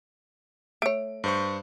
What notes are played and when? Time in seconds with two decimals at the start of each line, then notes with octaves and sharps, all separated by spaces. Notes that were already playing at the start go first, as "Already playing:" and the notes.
0.82 A3 C#5 D7
1.24 G2 C5 C#6